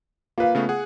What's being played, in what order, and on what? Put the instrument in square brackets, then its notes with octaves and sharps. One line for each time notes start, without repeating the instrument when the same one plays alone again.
[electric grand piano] A#3 B4 [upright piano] F4 F5
[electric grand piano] C#3 A3 B3
G#4 F#5